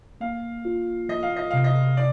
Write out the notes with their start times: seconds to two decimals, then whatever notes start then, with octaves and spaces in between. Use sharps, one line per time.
0.21 A#3 F5
0.65 F4
1.09 F3 D#5
1.23 F5
1.36 D#5
1.51 C3 F5
1.64 D#5
1.97 D5